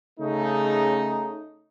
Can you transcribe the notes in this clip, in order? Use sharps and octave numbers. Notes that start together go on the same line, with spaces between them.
C#3 A3 D#4